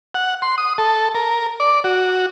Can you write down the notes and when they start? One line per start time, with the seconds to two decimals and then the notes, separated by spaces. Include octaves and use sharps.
0.15 F#5
0.42 C6
0.58 D#6
0.78 A4
1.15 A#4
1.60 D5
1.84 F#4